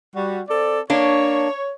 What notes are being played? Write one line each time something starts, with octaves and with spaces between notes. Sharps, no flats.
G3 F#4
C4 A4 D5
A#3 D4 C#5